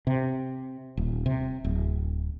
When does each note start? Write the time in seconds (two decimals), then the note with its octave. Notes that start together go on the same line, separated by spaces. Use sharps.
0.07 C3
0.97 D#1
1.26 C3
1.64 D1